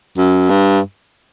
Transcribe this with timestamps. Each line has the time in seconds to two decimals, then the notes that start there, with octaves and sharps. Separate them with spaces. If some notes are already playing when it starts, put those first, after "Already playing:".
0.18 F#2
0.50 G2